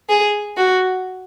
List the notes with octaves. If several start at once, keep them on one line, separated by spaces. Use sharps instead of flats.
G#4
F#4